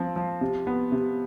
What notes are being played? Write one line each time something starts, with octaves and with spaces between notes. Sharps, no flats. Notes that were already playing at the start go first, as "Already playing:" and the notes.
Already playing: F3 C4
F3
C3
B3
C3